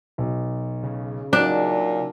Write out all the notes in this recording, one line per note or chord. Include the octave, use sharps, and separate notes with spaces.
B1
C#3
A#2 F#3 D4 D#4